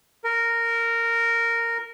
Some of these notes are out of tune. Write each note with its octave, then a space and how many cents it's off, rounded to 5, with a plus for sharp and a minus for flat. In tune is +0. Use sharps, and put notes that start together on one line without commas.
A#4 -10